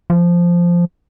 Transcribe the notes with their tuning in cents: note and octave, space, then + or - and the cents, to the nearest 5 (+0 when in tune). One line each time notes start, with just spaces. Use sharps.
F3 -5